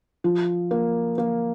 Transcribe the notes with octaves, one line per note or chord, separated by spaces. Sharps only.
F3
A#3
A#3